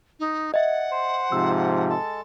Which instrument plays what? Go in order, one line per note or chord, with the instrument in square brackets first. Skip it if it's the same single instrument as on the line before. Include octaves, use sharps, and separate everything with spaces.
[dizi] D#4
[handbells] D#5 E5 [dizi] F#5
[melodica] C5
[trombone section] G#2 C3 F3 [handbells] E6
[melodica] G#3 A4 A5